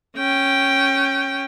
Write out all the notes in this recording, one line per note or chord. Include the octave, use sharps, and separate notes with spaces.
C#4 G5